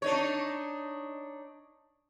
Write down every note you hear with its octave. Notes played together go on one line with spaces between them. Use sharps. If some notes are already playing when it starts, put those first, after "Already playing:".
D4 D#4 C#5